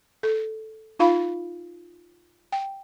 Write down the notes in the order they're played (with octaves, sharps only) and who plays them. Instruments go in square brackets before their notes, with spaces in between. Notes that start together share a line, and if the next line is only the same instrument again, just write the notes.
[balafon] A4
D#4 F4 F5 B5
G5